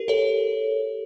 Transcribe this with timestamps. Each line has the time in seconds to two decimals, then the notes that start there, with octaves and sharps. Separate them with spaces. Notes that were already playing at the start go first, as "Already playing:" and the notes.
Already playing: G4 A#4
0.08 A4 C#5